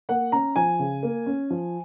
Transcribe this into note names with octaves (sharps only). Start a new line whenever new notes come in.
A#3 F#5
C#4 A#5
F3 G#5
C#3
A#3
C#4
F3